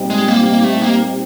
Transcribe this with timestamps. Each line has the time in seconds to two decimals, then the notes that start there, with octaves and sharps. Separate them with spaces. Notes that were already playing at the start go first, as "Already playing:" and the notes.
Already playing: A#2 G3 C4 D#4 G4
0.10 G#3
0.28 A#3
0.46 A#3
0.64 A3
0.81 A#3